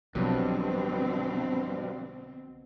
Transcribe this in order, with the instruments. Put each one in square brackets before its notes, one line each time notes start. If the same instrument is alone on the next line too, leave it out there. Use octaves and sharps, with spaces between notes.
[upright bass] B1 D3 [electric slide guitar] G2 [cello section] B2 C4 [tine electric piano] F3 F#3